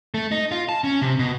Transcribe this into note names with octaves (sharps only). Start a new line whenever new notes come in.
A3
D#4
F4
A5
C#4
C3
B2